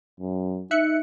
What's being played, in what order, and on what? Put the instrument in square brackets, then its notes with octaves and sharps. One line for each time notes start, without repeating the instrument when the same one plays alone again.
[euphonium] F#2
[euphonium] D#4 [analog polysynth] E5 F#6 C#7